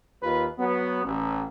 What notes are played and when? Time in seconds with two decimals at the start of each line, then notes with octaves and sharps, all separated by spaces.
0.23 D#2 F4 B4
0.59 F#3 B3
1.05 A1